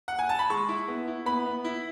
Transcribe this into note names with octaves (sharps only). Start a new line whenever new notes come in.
F#5
G#5
A5
B5
G#3 C#6
E4
B3
E4
B3 B5
B3
E4